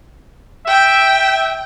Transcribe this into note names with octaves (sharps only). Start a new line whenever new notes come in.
E5 G5